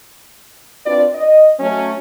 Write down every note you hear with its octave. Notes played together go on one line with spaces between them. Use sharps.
C4 D4 F4 B4 D5
D#5
F#3 A3 C#4